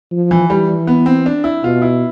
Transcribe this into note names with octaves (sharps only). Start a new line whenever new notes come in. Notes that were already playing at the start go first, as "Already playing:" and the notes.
F3
E3
E3 G3
B3
C4
D4
E4
B2 F4
E4